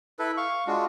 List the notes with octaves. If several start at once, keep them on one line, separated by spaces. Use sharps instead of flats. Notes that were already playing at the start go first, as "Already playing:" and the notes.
E4 A4 B4
F5 C#6
G#3 D4 F4 F#4